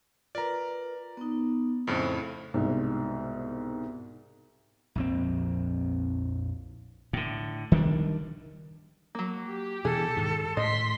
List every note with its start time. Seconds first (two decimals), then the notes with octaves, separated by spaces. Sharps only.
0.35 F4 A#4 B4 D5 A#5
1.17 B3 D#4
1.87 F2 A2 C#3 C5
2.54 C2 G#2 B2
4.95 A#1 F2 C4
7.13 A2 D3
7.72 D#3 G3 C#4 D4
9.15 F#3 A#3
9.46 G4
9.85 B2 E3 G#4 A4
10.17 G#2 D#3
10.57 A2 D#5 C6 B6